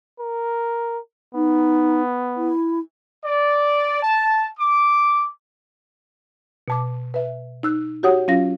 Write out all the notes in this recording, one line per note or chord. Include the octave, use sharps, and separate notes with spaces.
A#4
B3 D#4
E4
D5
A5
D6
B2 A5 D6
B4 E5
D#4 E6 F#6
F#4 G4 C#5 F#5 D#6
F#3 C#4 F4 F5 A#6